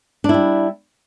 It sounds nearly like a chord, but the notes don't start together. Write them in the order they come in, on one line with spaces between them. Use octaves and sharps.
D4 E4 G3